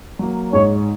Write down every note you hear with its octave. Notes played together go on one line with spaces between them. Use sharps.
F#3 A#3
G#2 C#5